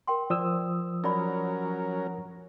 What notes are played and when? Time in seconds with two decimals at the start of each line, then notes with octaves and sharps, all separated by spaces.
0.07 A#4 G5 C6
0.30 F3 D5 D#6 E6
1.04 F#3 C#4 D#4 A#4 D5 B5